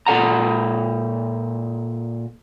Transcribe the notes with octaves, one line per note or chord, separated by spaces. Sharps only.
A#2 A4 F#5 A#5